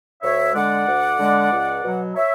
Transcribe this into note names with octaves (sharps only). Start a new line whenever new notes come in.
D2 C#5 E5
D3 G#3 D5 F#5
D2
D3 G#3
C#2
B2 F#3
C#5 E5